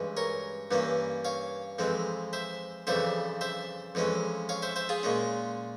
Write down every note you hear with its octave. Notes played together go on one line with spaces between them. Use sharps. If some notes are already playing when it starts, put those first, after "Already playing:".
Already playing: G2 E3 G#3 C#4
A#4 C#5
G2 E3 A#3 C#4
C#5 F5
F2 E3 G#3 C4
C5 E5
F2 C#3 E3 G3 C5 E5
C5 E5
F2 E3 G#3 C#4
C#5 F5
C5 E5
C5 E5
F4 G#4
A#2 G#3 C#4